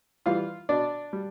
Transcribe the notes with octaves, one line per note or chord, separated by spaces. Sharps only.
E3 G3 F4 F5
B2 D4 D5
G3